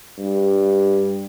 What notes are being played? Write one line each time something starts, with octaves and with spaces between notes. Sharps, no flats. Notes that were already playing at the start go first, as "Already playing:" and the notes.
G2